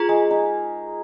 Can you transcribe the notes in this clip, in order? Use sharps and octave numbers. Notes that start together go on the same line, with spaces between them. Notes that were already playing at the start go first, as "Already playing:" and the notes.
Already playing: F4 G#4 A#4
G#3
D#4